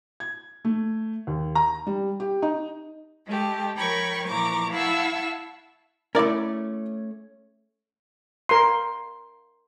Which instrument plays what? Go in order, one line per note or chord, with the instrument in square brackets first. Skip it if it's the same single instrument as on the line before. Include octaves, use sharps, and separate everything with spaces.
[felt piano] G#6
A3
D#2
A#5
G3
G4
D#4
[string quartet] G#3 A3 G4
F3 A#4 C#5 G5 B5 C#6
A#2 E3 F3 A#5 C#6 D6
E4 F5 F#5 A5 C#6 E6
[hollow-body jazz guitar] A3 C#4 [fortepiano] E4 E5 D6 [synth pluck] A#4 D5
[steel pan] A#4 C6